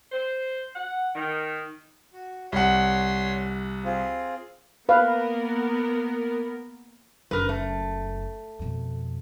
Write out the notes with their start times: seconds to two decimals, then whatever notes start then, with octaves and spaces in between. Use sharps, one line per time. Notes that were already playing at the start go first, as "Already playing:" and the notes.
0.12 C5
0.75 F#5
1.15 D#3
2.13 F#4
2.52 C2 C#5 F#5 C6
3.85 C4 F4 G#4
4.89 A#3 B3 A#4 B4 F5
7.31 F#1 A#4 B4
7.49 A3
8.59 F2 B2